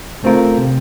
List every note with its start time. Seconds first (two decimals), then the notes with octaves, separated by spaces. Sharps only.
0.24 A3 C4 F4 A#4
0.58 C3